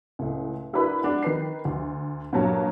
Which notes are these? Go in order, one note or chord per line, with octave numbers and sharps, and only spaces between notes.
C#2 A2
D4 E4 F#4 A#4 B4 B5
G#3 D4 F#5
D#3 B4 C7
D2
G2 A#2 F#3 A5 A#5